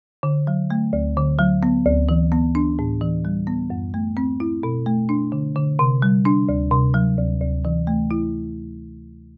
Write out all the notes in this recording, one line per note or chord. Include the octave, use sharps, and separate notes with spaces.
D3
F#3
A3
D2
D3
F#3
B3
D2
E3
B3
D4
A2
E3
G3
B3
F#2
A3
C4
E4
B2
A3
D4
D3
D3
C3
G3
D4
D2
C3
F#3
D2
D2
E3
A3
E4